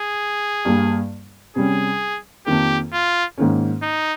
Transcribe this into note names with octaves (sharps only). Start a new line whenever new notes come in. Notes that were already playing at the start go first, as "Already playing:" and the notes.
Already playing: G#4
G2 G3 A#3
C3 G3 C#4 G#4
F2 D#3 A#3 G4
F4
G#2 D#3 A#3 C#4
D#4